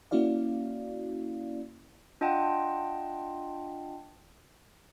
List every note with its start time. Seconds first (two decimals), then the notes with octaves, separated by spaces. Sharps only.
0.11 A#3 C#4 E4 F#4 D5 F5
2.21 D4 F4 D#5 F#5 G5 A5